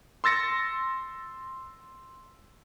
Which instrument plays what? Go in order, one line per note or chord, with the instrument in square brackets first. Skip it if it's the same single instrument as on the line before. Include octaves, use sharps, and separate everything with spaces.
[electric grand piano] C6 E6 A6 A#6 C#7